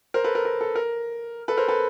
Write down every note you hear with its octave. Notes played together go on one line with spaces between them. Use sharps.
A#4 C5
A4 B4
A#4
A#4
A4
A#4
A4 B4
A#4 C5
A4 B4